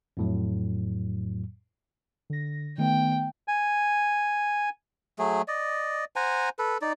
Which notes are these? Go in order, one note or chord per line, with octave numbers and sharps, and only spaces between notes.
F2 A2 F#3
D3 A#6
D#3 A3 B3 G5
G#5
F#3 A3 G#4
D5 D#5
C5 F#5 G#5 A#5
A4 B4
D#4 D5